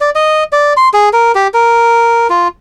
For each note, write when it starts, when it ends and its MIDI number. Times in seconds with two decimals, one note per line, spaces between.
0.01 0.10 74
0.15 0.44 75
0.52 0.73 74
0.77 0.88 84
0.94 1.09 68
1.13 1.32 70
1.35 1.48 67
1.54 2.28 70
2.30 2.48 65